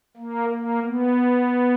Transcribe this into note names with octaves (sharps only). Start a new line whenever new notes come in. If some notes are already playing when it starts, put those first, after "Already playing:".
A#3
A#3
B3